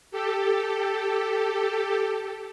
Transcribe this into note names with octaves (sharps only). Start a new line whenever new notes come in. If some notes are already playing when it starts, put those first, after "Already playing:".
G4 A4